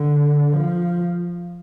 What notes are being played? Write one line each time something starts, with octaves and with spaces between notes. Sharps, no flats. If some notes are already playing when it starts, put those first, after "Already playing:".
Already playing: D3
F3